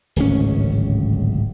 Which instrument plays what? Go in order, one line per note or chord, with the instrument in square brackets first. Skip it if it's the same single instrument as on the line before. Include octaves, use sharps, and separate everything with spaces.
[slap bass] D1 G#1 C#2 C#4